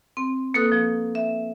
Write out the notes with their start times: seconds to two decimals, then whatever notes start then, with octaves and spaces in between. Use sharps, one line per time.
0.17 C4
0.54 A#3 A4 B4 D#6 F#6
0.72 F3
1.15 E5